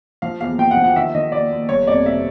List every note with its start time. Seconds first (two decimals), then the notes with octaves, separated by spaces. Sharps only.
0.22 F3 F5
0.41 E2 F5
0.59 F3 G5
0.71 F#5
0.77 F3
0.84 F#5
0.96 D#3 E5
1.15 D#3 D#5
1.32 D#2 D5
1.51 D#2
1.69 G1 C#5
1.87 F2 D5
2.05 C3 E5